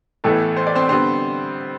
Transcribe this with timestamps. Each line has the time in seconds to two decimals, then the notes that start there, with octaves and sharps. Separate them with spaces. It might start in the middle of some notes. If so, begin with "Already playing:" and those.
0.24 A1 A2 E3 A3 B3 A4
0.57 C5
0.67 D5
0.75 C4 C5
0.89 D3 G3 B3 C4 C5